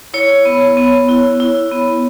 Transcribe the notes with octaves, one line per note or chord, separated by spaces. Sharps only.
E4 C#5
B3
B3
E4
E4
B3